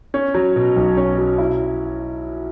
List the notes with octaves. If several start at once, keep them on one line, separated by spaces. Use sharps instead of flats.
C#4
F#3
B2
B1
C#4
F#3
E4